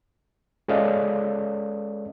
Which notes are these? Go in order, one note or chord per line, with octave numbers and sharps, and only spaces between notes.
G#3 C#4 A4 D5 D#5 F5